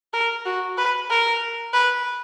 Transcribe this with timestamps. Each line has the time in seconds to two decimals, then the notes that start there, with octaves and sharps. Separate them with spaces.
0.13 A#4
0.46 F#4
0.77 B4
1.10 A#4
1.73 B4